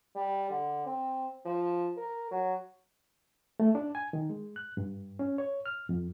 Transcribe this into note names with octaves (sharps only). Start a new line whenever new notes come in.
G3
D3
C4
F3
A#4
F#3
A3
D4
G#5
D#3
G#3
F#6
G2
C#4
C#5
F6
F2